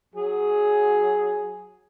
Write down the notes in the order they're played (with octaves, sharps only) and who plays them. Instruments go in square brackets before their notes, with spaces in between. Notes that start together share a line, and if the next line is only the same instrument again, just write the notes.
[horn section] F#3 G#4